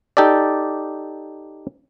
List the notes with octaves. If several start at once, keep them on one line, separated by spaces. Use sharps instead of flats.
D#4 G4 A4 D5